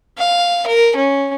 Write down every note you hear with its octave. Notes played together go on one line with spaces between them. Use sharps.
F5
A#4
C#4